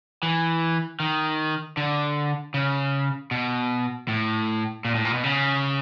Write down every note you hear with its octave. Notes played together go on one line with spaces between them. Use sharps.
E3
D#3
D3
C#3
B2
A2
A#2
A2
A#2
B2
C#3